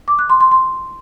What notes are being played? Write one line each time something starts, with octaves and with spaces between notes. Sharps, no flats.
D6
F#6
C6
C6
C6